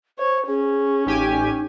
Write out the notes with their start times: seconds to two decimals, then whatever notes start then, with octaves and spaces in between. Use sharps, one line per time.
0.19 C5 C#5
0.48 C#4 G#4
1.06 A1 D#4 G4 G#5